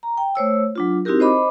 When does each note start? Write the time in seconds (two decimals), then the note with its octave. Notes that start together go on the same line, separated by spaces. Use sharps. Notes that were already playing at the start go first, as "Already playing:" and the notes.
0.03 A#5
0.18 G5
0.35 A3 C5 C#5 E6
0.75 F#3 D4 F4
1.05 C4 D#4 E4 F#4 G4 A#4
1.20 C5 D#5 B5 D6